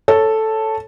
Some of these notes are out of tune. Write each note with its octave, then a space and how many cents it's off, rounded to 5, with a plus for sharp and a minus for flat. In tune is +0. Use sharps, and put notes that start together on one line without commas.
A4 +0 C#5 +0